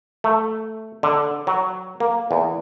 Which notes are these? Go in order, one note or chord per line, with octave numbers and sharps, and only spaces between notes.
A3
D3
F#3
A#3
E2